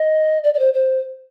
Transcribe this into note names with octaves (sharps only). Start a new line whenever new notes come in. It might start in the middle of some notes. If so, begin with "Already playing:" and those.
Already playing: D#5
D5
D5
C5
C5